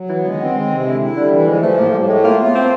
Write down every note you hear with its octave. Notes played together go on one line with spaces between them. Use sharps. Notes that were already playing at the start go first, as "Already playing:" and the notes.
Already playing: F#3
E3 B3
D3 G#3
D#3
D3 C4
D#3 G#3
C3
D3 E4
E4
D3 G3
E3
F3 G#3
F3 A3
A2 A#3
A2 G3
G#3 A3
A#3 F4
B3 F4
A3 C4